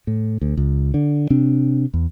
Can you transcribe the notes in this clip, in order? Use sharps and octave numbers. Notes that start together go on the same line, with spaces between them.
A2
D2
C#2
D3
C3 C4 D4
E2